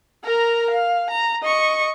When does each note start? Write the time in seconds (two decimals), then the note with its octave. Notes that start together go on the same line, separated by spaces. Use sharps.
0.24 A#4 A#5
0.71 F5
1.11 A#5
1.42 D#5 C#6